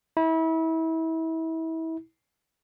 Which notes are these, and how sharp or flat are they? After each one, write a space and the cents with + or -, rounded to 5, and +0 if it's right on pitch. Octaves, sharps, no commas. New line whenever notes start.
E4 -30